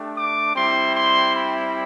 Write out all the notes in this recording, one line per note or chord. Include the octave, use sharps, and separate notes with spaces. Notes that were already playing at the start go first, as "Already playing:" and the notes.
Already playing: A3 D4 G4
D6
G3 C4 E4 C6
C6
B5